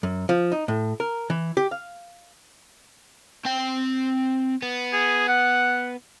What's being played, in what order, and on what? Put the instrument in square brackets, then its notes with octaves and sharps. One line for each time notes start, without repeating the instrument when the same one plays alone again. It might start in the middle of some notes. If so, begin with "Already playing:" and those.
[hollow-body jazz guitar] F#2
F3
D#4
A2
A#4
E3
G4
F5
[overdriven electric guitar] C4 G5
B3
[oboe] G#4
F#5